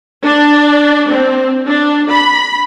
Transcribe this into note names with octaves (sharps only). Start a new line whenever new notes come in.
D4
C4
D4
B5